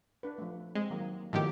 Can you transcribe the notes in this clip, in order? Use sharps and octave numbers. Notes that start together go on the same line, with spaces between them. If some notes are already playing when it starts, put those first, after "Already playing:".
D4 B4
F3 A3
G#3 C4
D#3 F#3 A#3
A2 D#3 F3 B3 F#4 G4